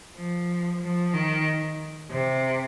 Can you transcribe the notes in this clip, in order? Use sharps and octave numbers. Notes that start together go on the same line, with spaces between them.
F3
F3
D#3
C3